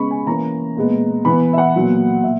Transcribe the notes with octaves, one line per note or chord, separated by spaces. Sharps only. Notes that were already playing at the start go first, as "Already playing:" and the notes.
Already playing: C#3 G#3 B3 B5 C#6
G#5
E3 A#3 C#4 A#5
A#2 G#3 B3
E3 B3 B5
E5
F#5
A#2 F#3 B3
A#2 E5